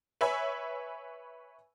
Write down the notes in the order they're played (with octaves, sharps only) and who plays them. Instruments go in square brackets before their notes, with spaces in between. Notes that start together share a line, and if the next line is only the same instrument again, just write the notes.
[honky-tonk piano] B4 C#5 E5 G#5 B5